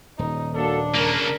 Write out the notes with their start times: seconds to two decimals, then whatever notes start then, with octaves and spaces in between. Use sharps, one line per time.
0.19 D#1 D#4
0.55 A#3 D4 F#4 A4
0.95 C#3 A#3 A#4